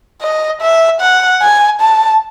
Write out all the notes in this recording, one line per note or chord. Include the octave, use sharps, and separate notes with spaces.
D#5
E5
F#5
G#5
A5